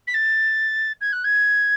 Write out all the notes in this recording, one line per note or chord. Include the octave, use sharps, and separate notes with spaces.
B6
A6
G#6
F#6
G#6